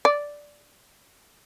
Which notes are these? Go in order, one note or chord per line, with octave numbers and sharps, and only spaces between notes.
D5